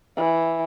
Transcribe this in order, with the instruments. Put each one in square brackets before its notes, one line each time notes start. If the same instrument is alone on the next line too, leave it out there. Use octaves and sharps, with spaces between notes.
[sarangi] E3